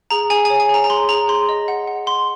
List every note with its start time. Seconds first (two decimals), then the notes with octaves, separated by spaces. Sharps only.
0.10 G#4 A#5
0.30 G#4 G#5
0.45 G#5
0.50 C#5
0.60 G#5
0.69 G#4 A#5
0.84 A#5
0.90 G#4 C6
1.09 G#4 A#5
1.28 G#4 C6
1.49 D#5
1.68 F#5
1.87 F#5
2.07 F#5 C6